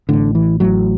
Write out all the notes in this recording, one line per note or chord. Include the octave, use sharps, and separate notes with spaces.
A1 A2 D3
E3
A1 A2 F#3